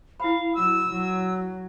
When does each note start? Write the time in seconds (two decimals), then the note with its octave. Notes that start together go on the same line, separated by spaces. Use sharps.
0.20 E4 F5 B5
0.54 F#3 E6
0.89 F#3